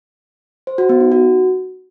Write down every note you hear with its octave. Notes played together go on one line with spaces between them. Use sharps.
C5
F#4
B3
D#4
F#4